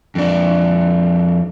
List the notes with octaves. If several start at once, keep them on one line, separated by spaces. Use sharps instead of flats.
F2 D4